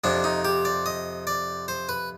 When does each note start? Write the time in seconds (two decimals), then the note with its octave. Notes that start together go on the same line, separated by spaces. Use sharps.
0.04 F2 C3 F3 D4
0.24 D#4
0.45 G4
0.65 D5
0.86 D#5
1.27 D5
1.68 C5
1.89 B4